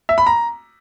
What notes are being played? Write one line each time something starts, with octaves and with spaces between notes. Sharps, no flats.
E5
B5
A#5